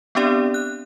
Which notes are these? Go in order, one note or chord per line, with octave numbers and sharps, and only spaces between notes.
B3 C4 D4 G4 D5
F#6